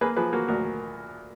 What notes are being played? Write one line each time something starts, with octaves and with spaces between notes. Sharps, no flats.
A#3 G#4 B4
F3 G#4 B4
A#3 F#4 A#4
D2 F#4 A#4